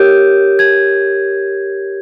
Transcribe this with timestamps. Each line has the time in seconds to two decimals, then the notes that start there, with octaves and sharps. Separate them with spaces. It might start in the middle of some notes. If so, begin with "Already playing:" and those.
Already playing: G4 A#4 C#5 G6
0.59 G#6